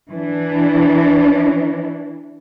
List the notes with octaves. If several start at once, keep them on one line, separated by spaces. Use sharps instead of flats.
E3 D4